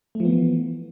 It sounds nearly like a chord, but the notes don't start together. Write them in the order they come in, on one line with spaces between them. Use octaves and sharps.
A3 F3 B3 E3